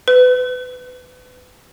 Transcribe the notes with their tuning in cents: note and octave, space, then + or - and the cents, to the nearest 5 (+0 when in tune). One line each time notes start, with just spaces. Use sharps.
B4 +25